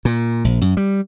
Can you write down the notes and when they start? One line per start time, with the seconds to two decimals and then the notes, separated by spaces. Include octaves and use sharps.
0.05 A#2
0.44 A#1
0.61 F#2
0.77 G3